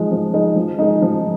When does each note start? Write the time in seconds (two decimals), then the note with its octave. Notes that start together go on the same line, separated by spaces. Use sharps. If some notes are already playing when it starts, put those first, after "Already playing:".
Already playing: F3 G#3 D#4
0.11 F3
0.34 G#3 D#4
0.56 F3
0.79 G#3 D#4
1.02 F3